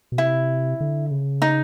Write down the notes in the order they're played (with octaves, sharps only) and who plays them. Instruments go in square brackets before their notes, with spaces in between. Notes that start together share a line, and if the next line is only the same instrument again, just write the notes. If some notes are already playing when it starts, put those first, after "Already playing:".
[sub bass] B2
[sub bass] C3 [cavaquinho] E4
[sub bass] D3
C#3
[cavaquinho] D#4